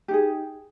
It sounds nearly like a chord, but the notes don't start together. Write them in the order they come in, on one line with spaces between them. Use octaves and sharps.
G4 D#4 G#4